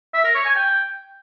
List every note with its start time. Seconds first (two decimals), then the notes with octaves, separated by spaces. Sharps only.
0.14 E5
0.24 A#4
0.35 C#5
0.45 G#5
0.56 G5